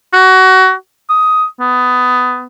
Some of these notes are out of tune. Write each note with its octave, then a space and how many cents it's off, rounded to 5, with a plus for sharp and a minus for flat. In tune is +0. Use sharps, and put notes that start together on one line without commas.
F#4 +25
D#6 +10
B3 +20